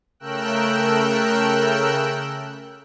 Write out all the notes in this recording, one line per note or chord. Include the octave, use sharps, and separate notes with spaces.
C#3 A3 A#4 G5 E6 F#6